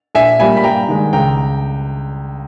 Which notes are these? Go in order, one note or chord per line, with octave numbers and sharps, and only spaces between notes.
A#1 E5 G#5
A#2 G3 A#3 G#5 B5
B5
G2 G5 A#5
D#3 G#3
C#2 G5 A#5